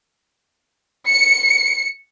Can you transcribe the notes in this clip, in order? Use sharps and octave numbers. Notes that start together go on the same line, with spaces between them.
C#7